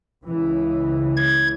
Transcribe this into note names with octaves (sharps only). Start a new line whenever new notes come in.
C#2 C#3 E3
G#6